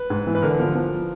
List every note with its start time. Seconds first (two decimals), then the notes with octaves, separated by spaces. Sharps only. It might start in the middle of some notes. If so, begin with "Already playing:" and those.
Already playing: B4
0.10 G#2
0.27 E3
0.35 B4
0.42 D3 A#4
0.60 F3
0.75 F3